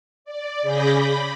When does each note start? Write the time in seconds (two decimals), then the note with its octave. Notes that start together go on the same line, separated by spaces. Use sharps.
0.25 D5
0.62 C#3 G#4 B5 D6 G6 A#6
0.94 B5